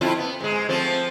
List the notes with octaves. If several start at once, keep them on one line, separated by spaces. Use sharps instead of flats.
F2 E4 F4
B3
G#2 G#3
F3 A3 C4